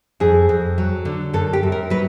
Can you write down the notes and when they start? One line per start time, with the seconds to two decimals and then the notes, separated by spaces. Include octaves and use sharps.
0.20 F2 G#4
0.49 F2
0.78 F#3
1.05 D3
1.33 F#2 A4
1.53 G4
1.63 F#2
1.72 A#4
1.90 F#3 B4